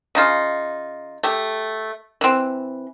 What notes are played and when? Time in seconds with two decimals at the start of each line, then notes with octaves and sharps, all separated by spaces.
0.15 C#3 D#4 F4
1.23 A3 G4
2.21 E3 C4